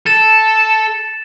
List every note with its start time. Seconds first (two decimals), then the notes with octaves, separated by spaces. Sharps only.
0.06 A4 A6 E7